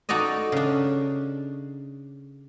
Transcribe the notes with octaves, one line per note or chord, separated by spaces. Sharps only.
D#4 F#4 A4 D5 D#5
C#3 D4